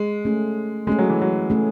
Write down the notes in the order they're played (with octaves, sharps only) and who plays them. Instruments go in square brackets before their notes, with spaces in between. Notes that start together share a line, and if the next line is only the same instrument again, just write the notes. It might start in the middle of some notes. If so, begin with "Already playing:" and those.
Already playing: [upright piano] G#3
[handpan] A3 C#4 G#4
[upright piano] G#3 [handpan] A3 C#4 G#4
[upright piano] F#3
E3
F#3
[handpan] A3 C#4 G#4